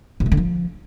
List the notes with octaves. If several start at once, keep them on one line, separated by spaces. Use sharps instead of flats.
C3
A3
D3
F3